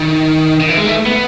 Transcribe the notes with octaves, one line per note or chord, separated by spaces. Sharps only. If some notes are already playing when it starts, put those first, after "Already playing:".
Already playing: D#3
D#3
E3
G#3
A3
B3